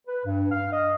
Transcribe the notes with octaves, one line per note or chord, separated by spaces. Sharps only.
B4
G2
F5
D#5